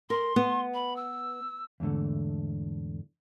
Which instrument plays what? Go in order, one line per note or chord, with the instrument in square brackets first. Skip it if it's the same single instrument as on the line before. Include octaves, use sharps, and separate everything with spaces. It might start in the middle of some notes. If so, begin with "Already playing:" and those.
[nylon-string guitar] A#4 [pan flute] C6
[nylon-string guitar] B3
[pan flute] B5
E6
[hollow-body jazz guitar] E2 G#2 D3 A3